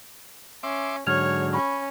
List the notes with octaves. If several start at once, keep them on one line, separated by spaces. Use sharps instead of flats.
C#4 E5 C6 D6
G#2 D3 F#3 C#5 F6 G#6 F7
C#4 B5 C#6